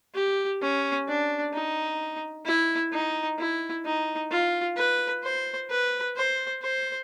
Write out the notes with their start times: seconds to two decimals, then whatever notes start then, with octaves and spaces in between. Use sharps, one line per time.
0.15 G4
0.61 C#4
1.08 D4
1.53 D#4
2.46 E4
2.93 D#4
3.39 E4
3.85 D#4
4.31 F4
4.77 B4
5.23 C5
5.70 B4
6.16 C5
6.62 C5